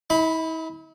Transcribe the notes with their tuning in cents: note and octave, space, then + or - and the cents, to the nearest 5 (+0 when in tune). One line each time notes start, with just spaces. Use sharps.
E4 -45 B5 +0